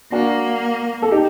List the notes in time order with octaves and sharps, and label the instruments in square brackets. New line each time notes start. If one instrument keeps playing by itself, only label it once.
[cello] A#3 [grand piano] D4 F#4
[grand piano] A4
D#4 G4